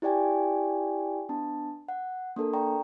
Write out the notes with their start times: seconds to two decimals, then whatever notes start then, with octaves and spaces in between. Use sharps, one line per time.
0.02 E4 G4 D5 G5 G#5
1.29 B3 D4 A5
1.88 F#5
2.36 A#3 D4 A4 A#4
2.53 D5 G5 A#5 C#6